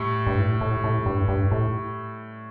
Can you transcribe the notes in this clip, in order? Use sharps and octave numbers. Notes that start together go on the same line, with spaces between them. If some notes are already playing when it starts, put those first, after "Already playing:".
Already playing: A2 G3
G2
A2
A2
A2
G2
G2
A2